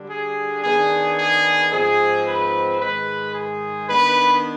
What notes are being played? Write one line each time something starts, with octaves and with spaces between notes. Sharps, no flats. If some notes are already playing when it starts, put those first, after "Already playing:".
Already playing: D3 G3 D4
G#4
D#3 B3 D4 G#4
G#4
G#2 F3 C4 G#4
B4
G#2 D#3 G#3 B4
G#4
D#3 B3 D4 B4